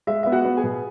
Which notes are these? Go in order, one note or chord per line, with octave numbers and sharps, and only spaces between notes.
G#3 E5
B3 E5
F#4 F#5
B3
G#4 G#5
B2